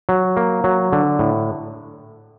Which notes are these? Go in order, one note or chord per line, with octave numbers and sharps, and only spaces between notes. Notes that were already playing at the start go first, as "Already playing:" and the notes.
F#3
A#3
F#3
D3
A2